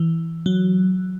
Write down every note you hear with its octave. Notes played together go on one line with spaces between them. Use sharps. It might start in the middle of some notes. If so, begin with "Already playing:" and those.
Already playing: E3
F#3